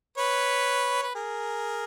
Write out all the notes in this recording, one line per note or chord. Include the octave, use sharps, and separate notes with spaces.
B4 C#5
B4
G#4 A#4